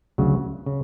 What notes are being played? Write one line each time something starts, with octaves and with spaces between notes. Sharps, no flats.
D2 C#3 F#3
C#3